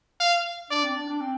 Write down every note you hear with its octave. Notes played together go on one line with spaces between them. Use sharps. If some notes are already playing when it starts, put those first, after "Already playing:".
F5
D4 D5
C4
D4
D4
C4